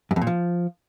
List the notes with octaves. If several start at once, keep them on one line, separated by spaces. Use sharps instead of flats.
F#2
F2
A#2
F3